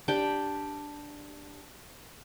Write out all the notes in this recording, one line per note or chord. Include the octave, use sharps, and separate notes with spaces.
D4 G4 G5